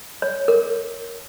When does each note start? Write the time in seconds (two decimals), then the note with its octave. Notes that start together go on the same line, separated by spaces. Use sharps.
0.22 C#5
0.48 A#4